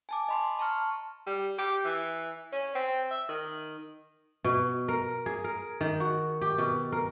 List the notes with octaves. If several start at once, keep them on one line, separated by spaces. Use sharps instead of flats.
G#5 A5 D6
D#5 B5 C6
A5 A#5 C6 C#6 F6
G3
G4
E3
C#4
C4
E5
D#3
B2
A#4
G#4
A#4
D#3
F#4
G4
B2
A#4